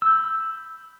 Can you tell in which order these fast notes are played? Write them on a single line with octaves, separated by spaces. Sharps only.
E6 G6 B5